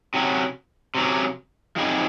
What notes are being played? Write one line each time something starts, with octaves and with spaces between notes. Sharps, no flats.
C3 F#3 C#4
C3 F#3 C#4
F#2 F3 C4 D#4 G#4